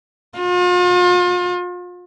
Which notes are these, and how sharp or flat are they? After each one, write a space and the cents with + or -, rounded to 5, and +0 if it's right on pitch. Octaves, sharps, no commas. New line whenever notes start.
F4 +40